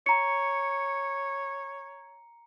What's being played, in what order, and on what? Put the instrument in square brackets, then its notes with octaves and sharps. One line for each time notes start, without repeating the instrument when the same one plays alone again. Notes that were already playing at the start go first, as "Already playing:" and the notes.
[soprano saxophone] C#5 [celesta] A#5 C#7